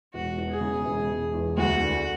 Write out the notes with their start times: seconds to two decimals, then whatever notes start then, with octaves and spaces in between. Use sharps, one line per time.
0.13 E1 F#4
0.38 E2
0.49 G#4
0.61 C#3
0.85 E1
1.10 E1
1.33 E2
1.57 D2 F#4
1.80 D3